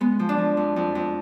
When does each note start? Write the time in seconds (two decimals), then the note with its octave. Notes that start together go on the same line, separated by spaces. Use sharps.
0.01 G#3 B3
0.19 F3
0.29 D4
0.38 F3
0.57 F2
0.76 F2
0.95 F2